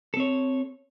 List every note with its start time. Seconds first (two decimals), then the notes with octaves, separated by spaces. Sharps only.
0.14 A4
0.17 C4
0.20 C#5